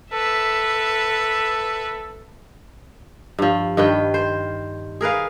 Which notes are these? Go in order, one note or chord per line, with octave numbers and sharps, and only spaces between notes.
A4 B4 E5
G2 F3
G2 D#3 B4 G5
C5
G#4 A#4 B4 F5